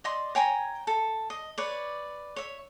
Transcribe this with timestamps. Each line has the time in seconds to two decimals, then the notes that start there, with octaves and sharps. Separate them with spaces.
0.04 D5 D#5 C6
0.35 C#5 G5 G#5 A#5
0.87 A4
1.30 D#5
1.58 B4 C#5 D5
2.36 C#5 E5